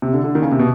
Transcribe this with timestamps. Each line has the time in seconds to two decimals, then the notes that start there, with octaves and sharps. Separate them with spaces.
0.02 C3
0.14 D3
0.24 D3
0.35 D#3
0.42 C#3
0.51 C3
0.59 B2